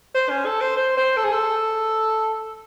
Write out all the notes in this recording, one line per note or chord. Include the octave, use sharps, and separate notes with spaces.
C5
C#4
A4
C5
C5
C5
A4
G#4
A4